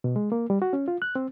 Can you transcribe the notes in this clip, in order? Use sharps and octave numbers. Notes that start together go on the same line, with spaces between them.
B2
G#3
A#3
G3
F#4
C#4
F4
F#6
C4